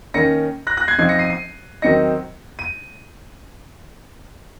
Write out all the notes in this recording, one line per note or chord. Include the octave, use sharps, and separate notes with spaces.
D#3 A#3 C#4 A#6 C#7
F#6 A#6
F#6 A#6
G#6 C7
F3 C4 D#4 G#6 C7
A#6 C#7
C7 D#7
C7 D#7
D#3 F#3 C4 D#4 A#6 C#7
D#7